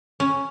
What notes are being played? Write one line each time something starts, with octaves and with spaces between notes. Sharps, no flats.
C#4